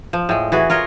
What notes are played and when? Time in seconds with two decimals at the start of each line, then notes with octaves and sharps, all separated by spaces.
0.13 F3
0.29 A2 G#3
0.52 E3 F#4 G#4
0.70 F4 A#4 C#5 D#5